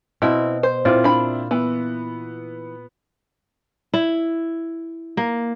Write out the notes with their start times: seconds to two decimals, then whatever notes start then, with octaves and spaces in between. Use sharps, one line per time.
0.22 B2 C4 E4
0.63 C5
0.85 A#2 C4 E4 F4 D5
1.04 D4 B5
1.51 E3 B3
3.94 E4
5.17 A#3